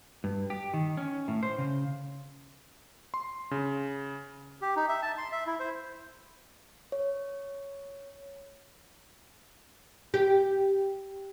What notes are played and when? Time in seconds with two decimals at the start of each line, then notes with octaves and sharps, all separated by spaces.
0.24 G2
0.50 G4
0.74 D#3
0.97 C#4
1.28 A2
1.43 C5
1.58 C#3
3.14 C6
3.51 C#3
4.61 G4
4.76 D#4
4.89 E5
5.02 A5
5.18 C6
5.32 E5
5.47 E4
5.60 C5
6.92 C#5
10.14 G4